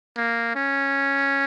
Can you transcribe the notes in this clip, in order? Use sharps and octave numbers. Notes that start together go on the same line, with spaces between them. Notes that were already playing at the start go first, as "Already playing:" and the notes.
A#3
C#4